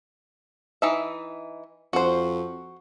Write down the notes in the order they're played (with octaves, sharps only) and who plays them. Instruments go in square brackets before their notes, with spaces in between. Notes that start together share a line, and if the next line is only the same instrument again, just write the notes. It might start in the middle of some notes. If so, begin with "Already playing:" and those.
[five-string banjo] E3 D#4 E5
[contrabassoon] F2 [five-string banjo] F#4 C5